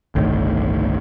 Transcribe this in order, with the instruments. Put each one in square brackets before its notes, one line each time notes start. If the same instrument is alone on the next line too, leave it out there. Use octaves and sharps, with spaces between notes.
[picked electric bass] G1 C2 A2 D#3